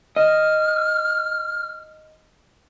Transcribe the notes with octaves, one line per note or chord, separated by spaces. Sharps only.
D#5 F6